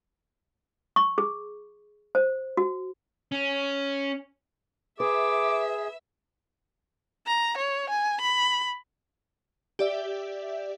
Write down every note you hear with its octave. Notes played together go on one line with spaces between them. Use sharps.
C#6
G#4
C5
F#4
C#4
G#4 B4 E5 D6
A#5
C#5
G#5
B5
G4 D5 E5